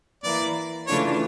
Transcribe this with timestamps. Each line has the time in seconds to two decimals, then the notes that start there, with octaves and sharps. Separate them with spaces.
0.24 E3 A#3 E4 D5
0.87 C#3 E3 A3 D4 F4 C#5